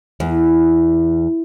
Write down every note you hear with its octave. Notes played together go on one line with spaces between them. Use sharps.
E2